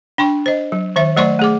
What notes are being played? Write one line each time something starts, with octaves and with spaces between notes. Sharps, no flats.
D4 G5 C6 C#6
C5 D#5
F#3
D#3 C5 E5
F#3 A3 C5 D5 C6 C#6
A3 G#4 D6